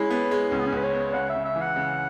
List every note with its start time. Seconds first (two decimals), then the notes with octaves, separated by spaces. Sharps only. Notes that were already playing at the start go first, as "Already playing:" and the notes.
Already playing: G#3 C#4 E4
0.11 B3
0.31 G#3
0.52 C#2 C#4
0.59 B3
0.66 C#4
0.72 C#2 B4
0.83 C#5
0.93 B3
1.13 C#3 F#5
1.29 E5
1.35 C#3
1.45 E5
1.56 E3
1.61 F#5
1.76 C#3